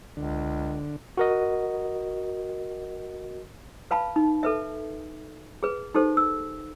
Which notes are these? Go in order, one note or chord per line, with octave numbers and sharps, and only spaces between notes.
C#2 D3
F#4 A#4 D#5
B4 F5 A5 B5
D#4
A4 B4 E5
G#4 B4
D#4 G4 A4 C5
E6